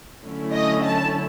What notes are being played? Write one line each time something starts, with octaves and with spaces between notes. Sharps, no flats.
D3 F#3 A3 C#4 E4
D#5
A5